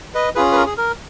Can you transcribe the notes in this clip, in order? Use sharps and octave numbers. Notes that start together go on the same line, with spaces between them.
B4 D#5
C#4 F4 G#4 B4
B4
A#4
G#4
A#4